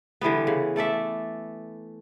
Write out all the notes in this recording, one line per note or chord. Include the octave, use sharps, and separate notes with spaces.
D3 E3 G3 B3
C#3
A3 A4 D5 E5